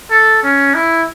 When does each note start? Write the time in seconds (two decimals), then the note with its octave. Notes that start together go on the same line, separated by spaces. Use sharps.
0.11 A4
0.43 C#4
0.74 E4